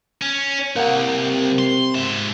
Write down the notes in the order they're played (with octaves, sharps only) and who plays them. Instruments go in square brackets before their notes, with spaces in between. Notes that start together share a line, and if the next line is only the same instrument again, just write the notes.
[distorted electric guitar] C#4
[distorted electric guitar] C2 [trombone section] C3 [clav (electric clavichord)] A#3 F#5
[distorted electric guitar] C6
G#2 E5